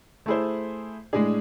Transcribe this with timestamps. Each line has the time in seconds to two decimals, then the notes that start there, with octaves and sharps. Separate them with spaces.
0.26 A3 E4 G#4 C5
1.13 A2 G#3 D4 G#4